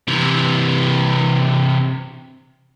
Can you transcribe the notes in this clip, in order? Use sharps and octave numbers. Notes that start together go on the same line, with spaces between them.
C3 E3